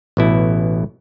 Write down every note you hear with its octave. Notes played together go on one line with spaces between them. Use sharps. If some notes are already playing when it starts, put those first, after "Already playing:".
A1 B2 E4